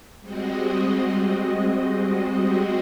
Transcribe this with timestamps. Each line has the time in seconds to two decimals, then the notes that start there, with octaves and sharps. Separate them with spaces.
0.21 G3 G#3 C4 F#4 D#5